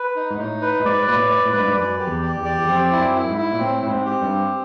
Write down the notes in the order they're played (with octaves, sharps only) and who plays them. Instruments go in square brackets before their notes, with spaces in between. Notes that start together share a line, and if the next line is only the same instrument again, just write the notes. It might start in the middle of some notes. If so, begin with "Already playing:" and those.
Already playing: [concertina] B4
D#4
[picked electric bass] G#2
[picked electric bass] A2 [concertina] D#4
[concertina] B4
[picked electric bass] A2
[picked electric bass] G#2 [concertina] D5
[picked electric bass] A#2 [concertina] B4
[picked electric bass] A2
[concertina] D5
[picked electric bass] A2
[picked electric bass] G#2 [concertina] B4
[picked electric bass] G2
G#2
[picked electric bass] F#2 [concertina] D5
[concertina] G4
[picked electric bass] E2
[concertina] G4
[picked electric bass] E2
[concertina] D5
[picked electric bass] E2
[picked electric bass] F2 [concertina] C4
[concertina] E4
[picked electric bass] F#2
[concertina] E4
[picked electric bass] G#2
[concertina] E4
[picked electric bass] A#2
[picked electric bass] A2 [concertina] C4
[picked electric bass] A2 [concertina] C4
[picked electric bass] G#2
[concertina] G4
[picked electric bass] G2
[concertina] C4